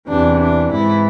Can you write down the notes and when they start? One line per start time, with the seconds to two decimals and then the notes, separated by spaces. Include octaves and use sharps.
0.09 E2 C3 E3 D4
0.40 D4
0.71 G#2 E3 E4